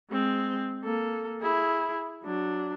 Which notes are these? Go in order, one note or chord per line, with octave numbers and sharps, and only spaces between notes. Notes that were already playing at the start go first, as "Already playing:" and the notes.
G#3 C4
A#3 A4
E4 G#4
F#3 D4